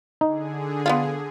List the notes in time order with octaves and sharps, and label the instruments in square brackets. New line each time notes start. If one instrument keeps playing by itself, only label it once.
[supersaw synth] D3 G#4 [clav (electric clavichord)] D#4
[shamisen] B3 E4 F4